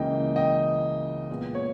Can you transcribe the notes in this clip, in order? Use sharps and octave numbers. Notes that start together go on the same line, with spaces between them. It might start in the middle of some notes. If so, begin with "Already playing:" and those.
Already playing: C#2 C#3 E3 A#3 D#5 G5
D#5 G5
A#2 G#3 B3
C#5